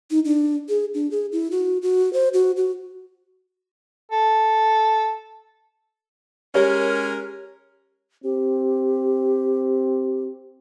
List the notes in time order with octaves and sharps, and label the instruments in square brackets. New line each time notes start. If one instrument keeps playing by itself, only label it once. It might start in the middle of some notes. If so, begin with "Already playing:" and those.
[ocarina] D#4
D4
G#4
D4
G#4
E4
F#4
F#4
C5
F#4
F#4
[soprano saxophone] A4
[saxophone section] G#3 C#4 A#4 [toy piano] G4 C#5
[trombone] C4 [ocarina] G4